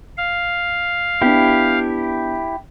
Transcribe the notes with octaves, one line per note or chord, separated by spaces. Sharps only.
F5
B3 D4 E4 G4